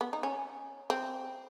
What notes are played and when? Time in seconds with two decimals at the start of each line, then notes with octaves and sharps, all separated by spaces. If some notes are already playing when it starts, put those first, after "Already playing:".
0.01 B3
0.13 D#4
0.23 C#4
0.90 C4